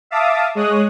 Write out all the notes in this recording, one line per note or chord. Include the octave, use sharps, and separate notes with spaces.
E5 F5 A5 D6 D#6
G#3 C#5 D#6 F#6